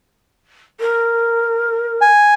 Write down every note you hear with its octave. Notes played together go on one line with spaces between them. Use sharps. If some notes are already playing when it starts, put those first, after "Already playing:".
A#4
G#5